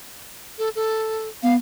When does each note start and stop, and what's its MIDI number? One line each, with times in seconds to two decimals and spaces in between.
0.58 0.69 69
0.76 1.28 69
1.43 1.56 59
1.43 1.54 77